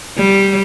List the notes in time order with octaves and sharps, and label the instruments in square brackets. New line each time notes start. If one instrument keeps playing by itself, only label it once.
[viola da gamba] G3